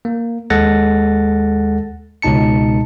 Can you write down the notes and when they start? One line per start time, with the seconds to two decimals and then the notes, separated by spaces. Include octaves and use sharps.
0.05 A#3
0.50 D#2 G#3 A4 F#5 A6 A#6
2.22 C#2 B2 D#4 A5 C#7